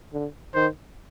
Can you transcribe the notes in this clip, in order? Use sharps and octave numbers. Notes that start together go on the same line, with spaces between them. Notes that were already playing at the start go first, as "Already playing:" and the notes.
D3
D#3 C5